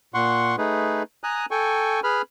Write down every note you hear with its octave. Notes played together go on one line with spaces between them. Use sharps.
A#2 F#5 C6 C#6
A3 D#4 G#4 B4
G#5 A#5 D#6 F#6
A4 G5 G#5 C#6
G#4 B4 B5 F6